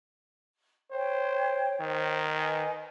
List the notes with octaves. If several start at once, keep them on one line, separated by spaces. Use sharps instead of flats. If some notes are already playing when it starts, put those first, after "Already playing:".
C5 C#5 G5
D#3 C5
B4 D#5 G#5